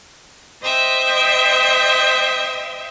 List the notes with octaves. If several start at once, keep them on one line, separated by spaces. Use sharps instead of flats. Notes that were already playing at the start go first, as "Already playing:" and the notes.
C5 D#5 E5 G5